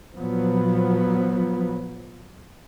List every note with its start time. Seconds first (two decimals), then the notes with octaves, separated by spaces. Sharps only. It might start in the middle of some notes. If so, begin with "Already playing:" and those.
0.16 A#2 F3 F#3 B3